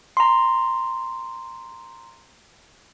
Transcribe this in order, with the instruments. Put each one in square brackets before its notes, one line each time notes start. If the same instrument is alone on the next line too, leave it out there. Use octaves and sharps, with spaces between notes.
[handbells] A#5 C6